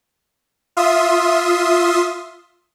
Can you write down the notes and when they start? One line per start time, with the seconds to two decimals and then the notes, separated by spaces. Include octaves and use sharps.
0.77 F4 E5 C6 D#6